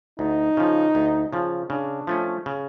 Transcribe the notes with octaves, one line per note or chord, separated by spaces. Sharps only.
D2 D#4
C#3 F3
D2
C#3 F3
C#3 D4
F3 A3 C#4
C#3